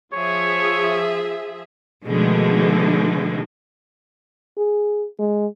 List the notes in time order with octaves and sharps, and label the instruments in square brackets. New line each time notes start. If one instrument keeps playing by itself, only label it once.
[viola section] F3 G#4 E5 [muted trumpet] C#5
[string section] B2 D3 D#3 F3 G#3 A3
[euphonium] G#4
G#3